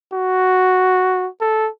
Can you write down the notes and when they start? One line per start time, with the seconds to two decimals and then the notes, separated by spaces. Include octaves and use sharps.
0.14 F#4
1.41 A4